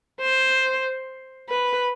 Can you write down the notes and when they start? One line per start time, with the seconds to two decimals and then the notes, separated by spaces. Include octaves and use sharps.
0.21 C5
1.49 B4